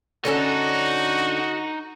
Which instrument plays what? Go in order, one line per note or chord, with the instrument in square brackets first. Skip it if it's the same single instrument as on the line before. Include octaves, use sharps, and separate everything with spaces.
[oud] D3 C#4 A4 [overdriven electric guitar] D#4 [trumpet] F#4